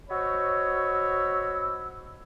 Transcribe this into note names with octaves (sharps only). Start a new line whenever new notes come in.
F#4 C5 C#5 D#5 B5 E6